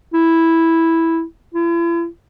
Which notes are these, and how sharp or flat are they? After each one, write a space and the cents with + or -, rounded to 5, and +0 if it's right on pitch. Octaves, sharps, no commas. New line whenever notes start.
E4 -5
E4 +40